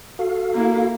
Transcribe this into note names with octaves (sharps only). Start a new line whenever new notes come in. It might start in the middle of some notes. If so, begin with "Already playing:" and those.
F#4 A4 F5
A#3 E4